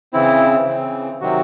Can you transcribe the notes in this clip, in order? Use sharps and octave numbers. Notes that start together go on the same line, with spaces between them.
C#3 E3 C4 E4
C#3 E3 C4
C3 D#3 F#3 C4 F#4